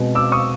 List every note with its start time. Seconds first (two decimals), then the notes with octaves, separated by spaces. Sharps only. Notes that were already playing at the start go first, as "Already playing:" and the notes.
Already playing: B2 G#3 C4
0.15 D6 E6
0.32 C#6 D#6